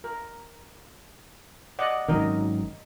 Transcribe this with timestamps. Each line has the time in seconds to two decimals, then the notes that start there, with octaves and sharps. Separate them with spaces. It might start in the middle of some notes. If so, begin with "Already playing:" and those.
0.04 A#4
1.79 D5 D#5 F#5
2.08 G#1 F#2 D#3 A#4 D#5